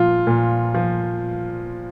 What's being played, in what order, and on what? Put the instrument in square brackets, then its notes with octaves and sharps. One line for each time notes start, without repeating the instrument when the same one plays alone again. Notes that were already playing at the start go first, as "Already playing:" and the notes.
Already playing: [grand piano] A#2 F3 F4
A#2
F3